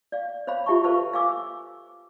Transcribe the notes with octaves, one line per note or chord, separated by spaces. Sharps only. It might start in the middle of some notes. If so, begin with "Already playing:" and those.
D5 F5
C5 C#5 F5 B5
F4 G4 E5 A5 C#6
A4 B4 C5 F5 A5 C#6
F5 G#5 D6 E6